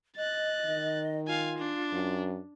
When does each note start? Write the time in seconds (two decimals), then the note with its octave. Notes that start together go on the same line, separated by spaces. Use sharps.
0.16 D#5 F#6 A6
0.66 D#3
1.27 F4 F5 G#5
1.58 D4
1.93 F#2